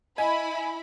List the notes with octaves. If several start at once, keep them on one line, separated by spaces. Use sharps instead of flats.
E4 D#5 G#5 B5